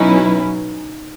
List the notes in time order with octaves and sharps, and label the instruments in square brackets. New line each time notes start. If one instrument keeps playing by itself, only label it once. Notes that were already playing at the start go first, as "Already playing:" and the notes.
Already playing: [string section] B2 F#3 C#4 E4 B4 [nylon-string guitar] D#4